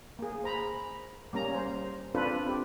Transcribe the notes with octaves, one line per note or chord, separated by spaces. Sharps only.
A#3 G#4
C5 A#5 B5
G3 A#3 C#4 A#5
C5
C4 D4 F4 A4 B4
C4 G4